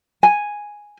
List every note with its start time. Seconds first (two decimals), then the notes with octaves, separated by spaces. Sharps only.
0.23 G#5